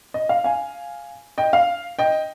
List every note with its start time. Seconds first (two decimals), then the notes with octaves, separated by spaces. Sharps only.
0.14 D#5
0.29 F5
0.44 F5 G#5
1.38 D#5 G5
1.53 F5
1.99 D#5 G5